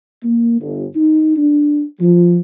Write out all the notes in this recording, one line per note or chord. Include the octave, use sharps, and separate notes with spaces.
A#3
G1
D#4
D4
F3